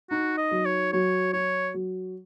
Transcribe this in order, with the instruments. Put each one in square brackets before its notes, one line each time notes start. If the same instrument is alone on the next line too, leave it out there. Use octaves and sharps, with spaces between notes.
[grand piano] D#4 [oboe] F#4
[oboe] D#5
[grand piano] F#3
[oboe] C#5
[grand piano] F#3 [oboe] C#5
[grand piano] F#4 [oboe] C#5
[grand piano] F#3